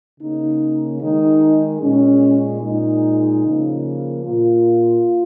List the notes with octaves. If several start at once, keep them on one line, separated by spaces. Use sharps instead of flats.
C#3 A#3 D#4
D#3 G#3 D#4
A#2 G#3 C#4
A#2 G#3 D#4
C#3 F3 A#3
A#2 A#3 F4